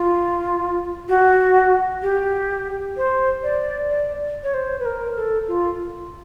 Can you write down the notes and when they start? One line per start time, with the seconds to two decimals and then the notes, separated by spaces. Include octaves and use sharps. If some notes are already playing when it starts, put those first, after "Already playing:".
Already playing: F4
1.09 F#4
2.02 G4
2.97 C5
3.43 D5
3.90 D5
4.43 C#5
4.54 C5
4.79 B4
4.85 A#4
5.16 A4
5.48 F4